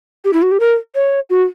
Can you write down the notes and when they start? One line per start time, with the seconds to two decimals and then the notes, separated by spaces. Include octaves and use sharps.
0.25 G4
0.33 E4
0.42 F#4
0.51 G4
0.60 A#4
0.95 C#5
1.30 F#4